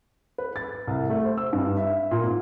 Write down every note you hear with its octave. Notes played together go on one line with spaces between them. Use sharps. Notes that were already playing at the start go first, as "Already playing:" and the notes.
B4
A6
C2
A3
C5
E6
G2
E5
A#2
G#2